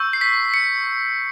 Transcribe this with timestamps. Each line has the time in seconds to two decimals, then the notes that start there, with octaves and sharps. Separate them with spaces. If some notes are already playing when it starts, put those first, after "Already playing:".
Already playing: C#6 E6 G6
0.13 C7
0.21 B6
0.54 C#7